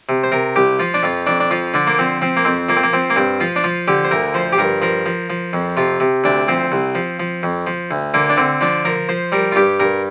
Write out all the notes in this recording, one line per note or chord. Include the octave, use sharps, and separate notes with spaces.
C3
C5
C3 A#4
C2 G4
F3 F4
D4
F2 F4
F2 D4
D4
F3 F4
D3 D4
A#3
F3 C4
F3 C4
A#3
F2 C4
F3 A#3
C4
A#3
F3 C4
A#3
G2 C4
F3 F4
D4
F3 F4
D3 G4
C5
D2 A#4
F3 C5
G4
G2 A#4
F3 A#4
F3
F3
F2
C3 F4
C3
D2 D4
F3 C4
C2
F3
F3
F2
F3
D2
D3 A#3
D4
D3 C4
F3 D4
F3 A#4
F3 C5
G3 A#4
F4
G2 G4
G2 A#4